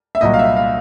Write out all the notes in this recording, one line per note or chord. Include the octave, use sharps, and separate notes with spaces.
E5
C2 A#2 F#3 D#5
F5
E5
F5